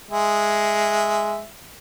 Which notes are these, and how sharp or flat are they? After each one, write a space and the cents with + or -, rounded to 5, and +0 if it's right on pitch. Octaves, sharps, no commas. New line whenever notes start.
G#3 +0 E5 +0